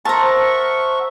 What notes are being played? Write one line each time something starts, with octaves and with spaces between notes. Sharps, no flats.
A#4 C5 E5 F#5 A5 A#5 C#6